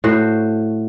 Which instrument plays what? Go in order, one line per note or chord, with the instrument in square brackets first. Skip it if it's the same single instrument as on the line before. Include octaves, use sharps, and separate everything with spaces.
[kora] A2 F#4 C5